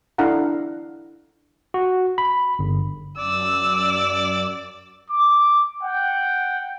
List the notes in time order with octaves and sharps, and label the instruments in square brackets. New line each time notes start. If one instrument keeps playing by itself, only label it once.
[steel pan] D4 E4 A4 F5 F#5 A#5
[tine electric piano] F#4
B5
G1
[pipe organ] F#2 [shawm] D5 [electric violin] E6
[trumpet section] D6
F#5 G5